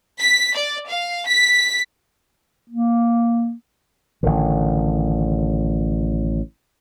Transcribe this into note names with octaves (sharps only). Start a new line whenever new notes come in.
B6
D5
F5
B6
A#3
A1 D3 D#3